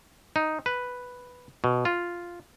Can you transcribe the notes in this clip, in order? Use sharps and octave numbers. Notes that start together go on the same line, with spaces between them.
D#4
B4
B2
F4